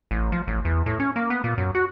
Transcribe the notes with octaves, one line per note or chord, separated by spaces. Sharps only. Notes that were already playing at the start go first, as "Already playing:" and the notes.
A1
F3
A1
E2
A2
C#4
A#3
B3
A#2
F#2
F#4